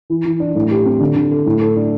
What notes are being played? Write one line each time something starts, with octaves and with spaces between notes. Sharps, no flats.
E3
E3
D4
A2
G4
C4
D3
D3
A4
A2
A4
D4